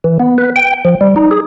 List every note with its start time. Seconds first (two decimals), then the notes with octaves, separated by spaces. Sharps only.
0.04 E3
0.20 B3
0.38 B4
0.56 G5
0.85 F3
1.01 G3
1.16 D#4
1.31 G#4